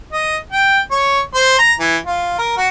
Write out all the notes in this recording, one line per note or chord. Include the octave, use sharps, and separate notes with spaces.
D#5
G5
C#5
C5
A#5
E3
F4
A#4
F#4